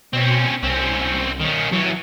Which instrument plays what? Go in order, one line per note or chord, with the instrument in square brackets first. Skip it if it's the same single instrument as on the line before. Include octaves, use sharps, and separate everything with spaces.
[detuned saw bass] B2 [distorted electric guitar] C4 C#4
[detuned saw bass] C2 [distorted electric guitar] C4 C#4
[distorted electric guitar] D#3 C#4
[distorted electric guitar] E3 C#4 [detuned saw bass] F#3